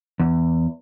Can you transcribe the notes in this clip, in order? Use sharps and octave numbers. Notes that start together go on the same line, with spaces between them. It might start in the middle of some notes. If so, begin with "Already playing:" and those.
E2